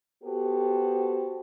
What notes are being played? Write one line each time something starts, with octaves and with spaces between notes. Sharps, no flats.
B3 F#4 G4 A4 C5